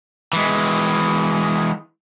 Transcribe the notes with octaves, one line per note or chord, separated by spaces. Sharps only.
E3 G#3